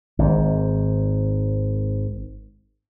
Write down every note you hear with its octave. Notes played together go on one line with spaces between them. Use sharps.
G#1 G#2